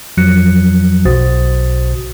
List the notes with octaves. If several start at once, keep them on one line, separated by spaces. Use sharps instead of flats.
F2 F3 F#3 F#6 C#7
B1 B2 F#4 C5 D#6 A6